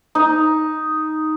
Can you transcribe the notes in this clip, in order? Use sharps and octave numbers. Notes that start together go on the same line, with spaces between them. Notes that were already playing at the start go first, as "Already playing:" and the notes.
D#4